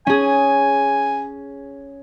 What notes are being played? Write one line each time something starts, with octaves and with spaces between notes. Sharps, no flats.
C#4 G#4 G#5